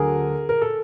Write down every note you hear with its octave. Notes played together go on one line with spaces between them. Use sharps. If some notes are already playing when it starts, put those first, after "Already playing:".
Already playing: D2 D3 F#3 G#4 A#4
A#4
A4